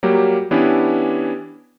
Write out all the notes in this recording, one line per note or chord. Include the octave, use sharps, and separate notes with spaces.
F#3 G3 A#3 G4
E3 B3 C#4 D4 E4 G4